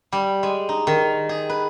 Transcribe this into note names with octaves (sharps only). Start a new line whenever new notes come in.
G3
G#3
D#4
D#3
G#4
B4